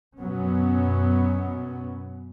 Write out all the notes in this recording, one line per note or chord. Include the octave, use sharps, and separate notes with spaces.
F#2 B2 F#3 B3 C#4